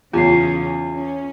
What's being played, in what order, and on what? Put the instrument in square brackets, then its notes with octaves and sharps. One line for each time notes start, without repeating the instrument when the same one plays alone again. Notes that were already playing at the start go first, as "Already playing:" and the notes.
[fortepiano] E2 [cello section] C#3 C#4 [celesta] F4 C7
[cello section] C#4